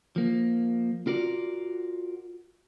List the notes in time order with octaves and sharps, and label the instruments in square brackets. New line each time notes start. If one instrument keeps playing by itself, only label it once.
[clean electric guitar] F3 A#3
F4 F#4 A#4 D5